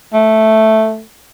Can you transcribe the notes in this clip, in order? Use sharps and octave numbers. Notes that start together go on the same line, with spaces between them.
A3